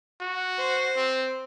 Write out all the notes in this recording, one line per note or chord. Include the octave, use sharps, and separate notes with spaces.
F#4
C5
C4